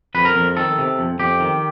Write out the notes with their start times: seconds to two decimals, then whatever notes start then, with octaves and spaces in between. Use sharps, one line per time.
0.15 F2 B4
0.25 A#4
0.36 F2
0.56 D#3 A4
0.78 C3
0.99 F2
1.19 F2 G4
1.40 D#3